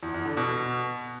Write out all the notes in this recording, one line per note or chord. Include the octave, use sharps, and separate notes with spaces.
E2
E2
D3
B2